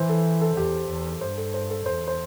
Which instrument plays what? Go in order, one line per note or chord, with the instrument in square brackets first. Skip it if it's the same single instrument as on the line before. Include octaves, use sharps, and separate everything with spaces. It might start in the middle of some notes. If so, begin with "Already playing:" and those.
Already playing: [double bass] E3 [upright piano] C5
[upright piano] A4
A4
[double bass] E2 [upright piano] G4
[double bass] E2
[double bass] G2 [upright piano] C5
[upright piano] A4
C5
A4
[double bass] E2 [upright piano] C5
[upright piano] C5